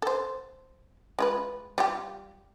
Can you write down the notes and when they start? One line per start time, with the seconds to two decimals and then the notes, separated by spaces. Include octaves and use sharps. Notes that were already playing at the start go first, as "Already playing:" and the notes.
0.02 A4 C5
1.19 G#3 F4 B4
1.78 G3 F4 G4